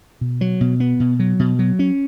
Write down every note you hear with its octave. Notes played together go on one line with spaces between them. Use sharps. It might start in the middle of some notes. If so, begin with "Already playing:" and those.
B2
F#3
B2
B3
B2
F#3
B2
F#3
C#4